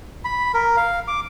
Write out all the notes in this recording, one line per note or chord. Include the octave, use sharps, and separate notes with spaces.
B5
A#4
F5
D6